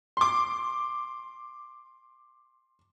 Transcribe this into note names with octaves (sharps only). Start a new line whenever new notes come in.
C6 D6